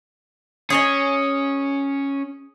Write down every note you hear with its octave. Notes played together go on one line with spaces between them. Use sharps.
C#4 G#4 C#5 D#5